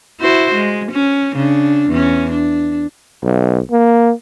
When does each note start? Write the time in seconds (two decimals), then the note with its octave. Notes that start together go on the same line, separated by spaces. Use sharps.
0.21 E4 F#4 C5
0.54 G#3
0.91 C#4
1.36 C#3 D4
1.89 E2 C#4
2.30 D4
3.24 B1
3.71 A#3